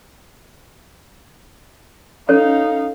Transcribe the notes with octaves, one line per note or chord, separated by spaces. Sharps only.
C#4 D#4 A4 C#5 F5